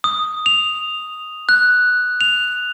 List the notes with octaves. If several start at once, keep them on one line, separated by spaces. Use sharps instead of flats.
D#6
F7
F#6
F7